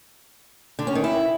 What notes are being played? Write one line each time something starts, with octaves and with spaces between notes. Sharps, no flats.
D3
C#4
D#3
E4